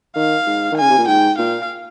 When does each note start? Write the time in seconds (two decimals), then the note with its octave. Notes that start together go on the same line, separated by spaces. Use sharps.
0.16 D#3 F5
0.47 G#2
0.72 D#3
0.77 C#3 G#5
0.90 C3
0.98 A#2
1.08 G#2 G5
1.38 A#2 F5